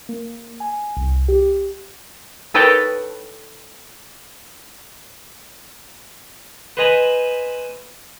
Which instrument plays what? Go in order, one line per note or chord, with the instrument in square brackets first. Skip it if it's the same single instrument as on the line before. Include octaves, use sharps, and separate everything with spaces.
[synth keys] A#3
G#5
C2
G4
[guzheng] A4 B4 C#5 D#5 G5 A5
[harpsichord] B4 C5 D#5 G#5 A#5 B5